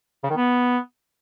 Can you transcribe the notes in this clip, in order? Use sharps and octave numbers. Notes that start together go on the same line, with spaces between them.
C#3
D#3
B3